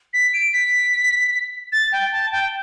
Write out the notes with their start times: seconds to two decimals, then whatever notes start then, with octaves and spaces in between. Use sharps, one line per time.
0.13 B6
0.33 D7
0.53 B6
1.72 A6
1.92 G5
2.12 A5
2.32 G5